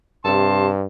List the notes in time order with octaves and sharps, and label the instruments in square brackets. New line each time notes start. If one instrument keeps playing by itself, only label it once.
[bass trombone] G2 [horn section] C3 A5 C6